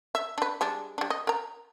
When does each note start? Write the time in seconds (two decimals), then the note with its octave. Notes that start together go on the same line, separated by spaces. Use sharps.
0.15 E5
0.38 D4 B4
0.61 G3 G#3 D4
0.98 G3 D4
1.10 D#5
1.27 A#4 A#5